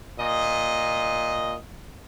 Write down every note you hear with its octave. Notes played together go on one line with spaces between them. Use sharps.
A#2 D#5